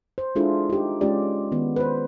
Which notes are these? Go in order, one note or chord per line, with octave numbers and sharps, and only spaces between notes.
C5
G#3 D4 E4 F4 G#4 A4
D#4 G4
G#3 C#4 F4 G4 D5
D#3 B3
B4 C5